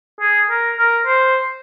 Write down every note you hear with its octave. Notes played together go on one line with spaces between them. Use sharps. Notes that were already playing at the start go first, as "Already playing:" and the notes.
G#4
A#4
A#4
C5